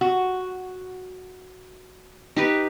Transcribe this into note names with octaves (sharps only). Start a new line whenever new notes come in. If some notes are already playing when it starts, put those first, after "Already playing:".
F#4
D#4 G4 B4